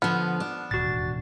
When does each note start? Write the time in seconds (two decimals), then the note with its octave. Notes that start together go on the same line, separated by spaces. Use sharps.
0.02 D3 F3 B3 F6
0.40 D4
0.71 E1 D#2 A2 F#4 A6